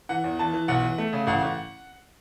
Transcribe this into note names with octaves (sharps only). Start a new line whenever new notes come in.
E3 F#5
E2
E3 A5
E3
B1 F#5
E3
A3
C#3
A1 F#5
A1